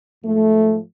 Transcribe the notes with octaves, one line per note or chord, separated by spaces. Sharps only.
G#2 F3 A3